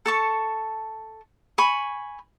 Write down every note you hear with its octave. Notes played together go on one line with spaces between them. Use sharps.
A4 A5 C#6
G#5 B5 C#6